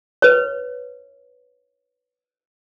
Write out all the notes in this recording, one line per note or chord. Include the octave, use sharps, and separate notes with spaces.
B4 C#5